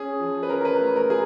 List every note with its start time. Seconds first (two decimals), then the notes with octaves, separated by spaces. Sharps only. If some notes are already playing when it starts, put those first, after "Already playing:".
Already playing: C#4 G#4
0.20 F3
0.43 B4
0.49 C#4 A#4
0.61 A#4
0.65 B4
0.80 A3 A#4
0.96 A#4
1.10 G#4